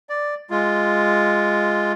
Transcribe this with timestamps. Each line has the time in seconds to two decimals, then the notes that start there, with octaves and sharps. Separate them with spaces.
0.09 D5
0.50 G#3 F4